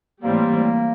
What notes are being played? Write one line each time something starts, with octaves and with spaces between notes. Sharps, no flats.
A2 E3 G3 A#3 C4